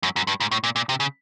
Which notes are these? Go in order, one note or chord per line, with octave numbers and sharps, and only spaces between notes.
F#2
F#2
G2
G#2
A2
A#2
A#2
C3
C#3